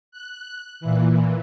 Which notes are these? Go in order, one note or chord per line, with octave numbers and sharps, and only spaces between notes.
F#6
A#2 E3